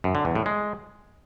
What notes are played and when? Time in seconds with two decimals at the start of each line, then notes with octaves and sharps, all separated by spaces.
0.04 F#2
0.15 D3
0.25 E2
0.35 A2
0.46 G#3